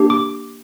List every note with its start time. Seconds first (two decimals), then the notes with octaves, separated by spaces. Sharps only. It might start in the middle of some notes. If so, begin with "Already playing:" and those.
Already playing: A#3 D4 G4
0.10 D6